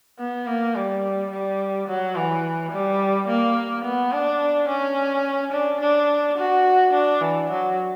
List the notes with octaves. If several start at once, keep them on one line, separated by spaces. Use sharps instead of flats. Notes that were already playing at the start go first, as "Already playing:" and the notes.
B3
A#3
G3
G3
F#3
E3
G3
A#3
B3
D4
C#4
D4
D4
F#4
D4
E3
F#3